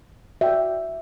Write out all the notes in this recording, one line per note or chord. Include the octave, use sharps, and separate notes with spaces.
F#4 D5 E5 G5